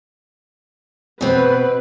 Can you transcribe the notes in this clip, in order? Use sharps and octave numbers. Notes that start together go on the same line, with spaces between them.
B2 C4 B4